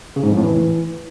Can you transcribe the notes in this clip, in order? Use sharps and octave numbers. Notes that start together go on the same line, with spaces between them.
C#3
G#2
F2
A2
E3